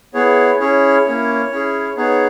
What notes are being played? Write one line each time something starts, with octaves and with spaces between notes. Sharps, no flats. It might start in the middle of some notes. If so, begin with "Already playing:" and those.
B3 E4 G#4 C#5
C#4 E4 G#4 C#5
A#3 C#4 E4
C#4 E4 G#4
B3 D#4 G#4 C#5